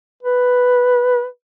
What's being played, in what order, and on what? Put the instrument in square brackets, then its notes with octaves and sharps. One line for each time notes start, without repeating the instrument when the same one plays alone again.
[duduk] B4